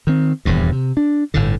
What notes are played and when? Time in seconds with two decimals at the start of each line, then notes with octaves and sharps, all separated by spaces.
0.07 D#3 C4
0.45 D#1 E2 G2
0.72 C3
0.97 D4
1.34 G1 A2 D3